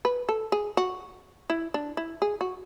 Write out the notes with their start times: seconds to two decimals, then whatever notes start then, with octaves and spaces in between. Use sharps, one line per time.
0.05 B4
0.29 A4
0.52 G#4
0.77 F#4
1.50 E4
1.74 D4
1.97 E4
2.22 G#4
2.41 F#4